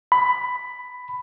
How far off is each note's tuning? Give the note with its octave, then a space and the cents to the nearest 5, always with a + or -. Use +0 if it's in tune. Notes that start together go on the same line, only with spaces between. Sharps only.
B5 +10